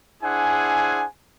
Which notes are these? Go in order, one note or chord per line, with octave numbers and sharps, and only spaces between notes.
D4 E4 G#4 C5 F#5 G#5